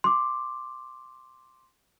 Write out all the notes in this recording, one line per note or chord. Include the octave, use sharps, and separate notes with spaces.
C6 D6